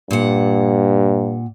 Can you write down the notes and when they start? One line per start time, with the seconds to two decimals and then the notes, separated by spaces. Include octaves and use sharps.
0.11 G2 A#2 F#5